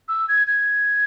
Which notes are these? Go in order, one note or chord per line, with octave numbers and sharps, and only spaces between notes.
E6
G#6
G#6